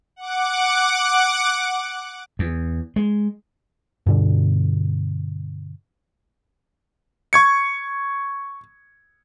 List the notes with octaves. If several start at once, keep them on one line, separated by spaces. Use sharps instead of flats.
F#5 D6
E2
G#3
G2 B2 D3
C#6 G#6 C#7